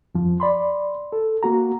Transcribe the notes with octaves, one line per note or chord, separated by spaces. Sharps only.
F2 F3
D5 B5 C6
A4
A#3 F#4 A#5